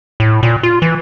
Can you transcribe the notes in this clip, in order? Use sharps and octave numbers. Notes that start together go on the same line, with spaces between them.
A2
A#2
F4
E3